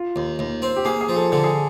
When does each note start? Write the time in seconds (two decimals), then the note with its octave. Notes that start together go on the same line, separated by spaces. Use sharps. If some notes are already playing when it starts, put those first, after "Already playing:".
Already playing: F4
0.16 D#2
0.39 D#2
0.62 C4
0.76 G4
0.85 A#3 G#4
1.01 G#4
1.09 F3
1.16 A4
1.32 D3 A4
1.44 G#4